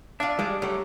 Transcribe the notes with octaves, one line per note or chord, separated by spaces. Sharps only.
D4 F4 D5 E5
G3 G#3
F#3 G3 A3